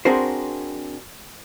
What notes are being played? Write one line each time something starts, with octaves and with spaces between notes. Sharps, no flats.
C4 D4 F#4 G#4 A#4 C5